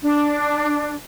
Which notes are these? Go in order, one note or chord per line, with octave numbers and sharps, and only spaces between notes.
D4